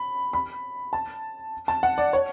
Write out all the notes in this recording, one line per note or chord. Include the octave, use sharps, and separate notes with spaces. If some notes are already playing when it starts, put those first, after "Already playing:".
Already playing: B5
B5
A5
A5
F#5
D5
C#5